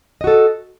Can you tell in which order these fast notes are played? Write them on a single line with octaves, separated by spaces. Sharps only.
D#5 F#4 A4